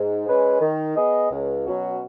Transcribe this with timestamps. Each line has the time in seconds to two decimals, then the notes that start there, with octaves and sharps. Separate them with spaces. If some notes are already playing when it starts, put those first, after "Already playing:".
Already playing: G#2
0.26 G#3 C#4 B4
0.61 D#3
0.96 B3 G#4 D#5
1.30 C#2
1.66 B2 F#3 C#4 F#4